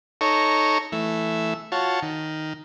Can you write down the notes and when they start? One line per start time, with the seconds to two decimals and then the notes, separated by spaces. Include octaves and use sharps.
0.21 D#4 A4 C#5 A#5 C#6
0.92 E3 A3 E5
1.72 F4 F#4 C#5 A5
2.02 D#3